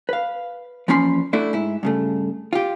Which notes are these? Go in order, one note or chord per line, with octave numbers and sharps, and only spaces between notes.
B4 F5
E2 F3 A#3 C#4 B5 C6
A3 D4 E4 F#4
G#2 E4
G2 C#3 A3
F4 G4